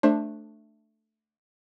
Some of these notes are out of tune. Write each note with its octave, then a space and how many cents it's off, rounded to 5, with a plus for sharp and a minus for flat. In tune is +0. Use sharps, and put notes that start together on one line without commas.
A3 +0 D4 +10 C5 +25